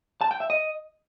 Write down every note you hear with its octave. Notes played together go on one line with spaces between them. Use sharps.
A5
G5
E5
D#5